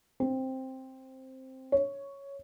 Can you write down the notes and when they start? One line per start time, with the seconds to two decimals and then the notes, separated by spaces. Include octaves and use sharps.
0.20 C4
1.72 C#5